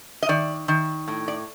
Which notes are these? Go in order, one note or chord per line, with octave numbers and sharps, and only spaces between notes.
D#5
D#3 D5
D#3
A2
D5